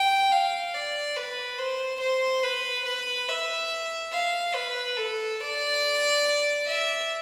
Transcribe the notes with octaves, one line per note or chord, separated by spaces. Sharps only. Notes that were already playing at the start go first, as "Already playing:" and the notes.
Already playing: G5
F5
D5
B4
C5
C5
B4
B4
E5
F5
B4
A4
D5
E5